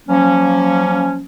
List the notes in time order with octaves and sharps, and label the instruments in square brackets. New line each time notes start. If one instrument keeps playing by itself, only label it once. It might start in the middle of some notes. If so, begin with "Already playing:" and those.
[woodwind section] F3 F#3 A#3 C#4